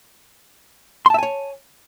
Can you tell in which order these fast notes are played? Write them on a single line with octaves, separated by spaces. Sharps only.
C6 A5 E5 G#5 C#5